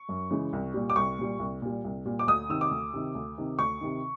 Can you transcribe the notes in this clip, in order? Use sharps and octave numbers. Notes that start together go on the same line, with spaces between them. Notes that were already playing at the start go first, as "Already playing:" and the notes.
Already playing: C#6
F#2
C#3 E3 G#3
C2
A#2 G3
D6
C2 C#6
A#2 G3
C2
A#2 G3
C2
A#2 G3
D6
D2 D#6
C3 D#3 E6
D6
D2
C3 D#3
D2
C3 D#3
D2 C#6
C3 D#3